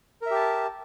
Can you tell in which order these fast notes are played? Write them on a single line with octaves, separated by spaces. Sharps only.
A#4 E5 G4 A5